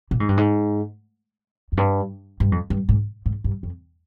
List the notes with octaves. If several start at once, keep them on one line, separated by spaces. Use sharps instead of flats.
A#2
G#2
G2
G#2
F2
G2
G2
F2
G2
G#2
G#2
G2
F2